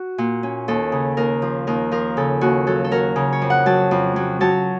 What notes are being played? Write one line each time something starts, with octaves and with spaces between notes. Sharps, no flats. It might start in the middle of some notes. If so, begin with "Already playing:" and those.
Already playing: F#4
A#2
C#4
D#2 A4
C#3
D#2 A#4
F3
D#2 A#4
F3 A#4
C#3 A4
D#2 F#4
F#3 A4
A4
F#3 A#4
C#3
C#5
F2
F#5
F#3 A5
F2
F#3
F#3 A5